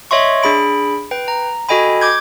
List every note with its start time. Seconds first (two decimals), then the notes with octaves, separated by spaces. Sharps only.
0.11 C#5 D#5 E5 C6 C#6
0.43 D4 G#4 B5 D7
1.11 B4 G5
1.28 A#5
1.69 F#4 A4 D#5 G5 G#5 B5
2.01 D6 G6 G#6